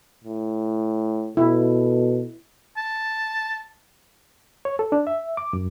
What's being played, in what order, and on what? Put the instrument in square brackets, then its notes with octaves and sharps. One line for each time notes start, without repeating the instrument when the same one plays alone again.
[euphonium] A2
[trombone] B2 [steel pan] E4 [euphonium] A4
[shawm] A5
[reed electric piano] C#5
A4
D4
E5
D6
F#2